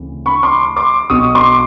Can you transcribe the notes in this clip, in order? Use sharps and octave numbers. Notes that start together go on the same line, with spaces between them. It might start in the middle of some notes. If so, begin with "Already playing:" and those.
Already playing: D2 C#3 E3 A3 C4
B5 C#6
C6 D6
C6 D6
B1 B2 F#3 C#6 D#6
C6 D6